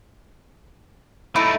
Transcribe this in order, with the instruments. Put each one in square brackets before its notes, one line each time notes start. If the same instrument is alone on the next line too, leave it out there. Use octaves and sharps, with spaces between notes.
[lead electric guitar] A3 D#4 [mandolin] E4